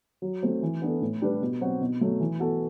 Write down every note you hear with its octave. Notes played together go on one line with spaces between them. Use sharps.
F#3
A3 C4
E3
B3 D4 A4
A2
G3 D4 G4 B4
B2
F#3 C4 F#4
B2
F#3 A3
E3
B3 F#4 A4